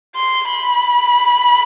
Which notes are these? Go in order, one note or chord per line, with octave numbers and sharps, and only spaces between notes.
C6
B5